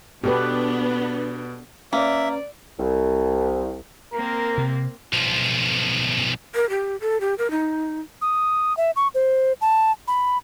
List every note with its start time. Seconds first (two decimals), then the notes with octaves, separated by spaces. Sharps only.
0.24 B2 B3 D4 G4 A4 B4
1.93 A#3 C#4 B4 D5 E5
2.80 C2
4.13 A#3 C4 A#4
4.58 C3
5.13 B1 F3
6.55 A#4
6.70 G4
7.01 A4
7.21 G4
7.38 A#4
7.51 D#4
8.22 D#6
8.77 E5
8.96 C#6
9.15 C5
9.61 A5
10.08 B5